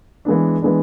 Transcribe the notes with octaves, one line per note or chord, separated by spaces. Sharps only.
E3 G#3 B3 D4
E3 G#3 B3 D4